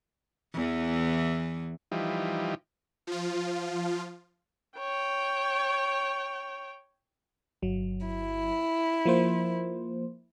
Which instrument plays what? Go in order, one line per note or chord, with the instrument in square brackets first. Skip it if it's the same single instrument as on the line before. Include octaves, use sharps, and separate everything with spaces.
[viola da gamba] E2 E3
[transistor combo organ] E3 F3 G3 D#4
[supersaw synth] F3 F4
[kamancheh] C#5 G5
[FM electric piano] G1 F#3
[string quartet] E4
[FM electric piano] F3 A#3 C5